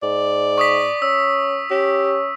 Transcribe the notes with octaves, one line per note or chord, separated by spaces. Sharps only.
G#2 D5
C#6 D#6 B6
C#4 E6
C#4 G4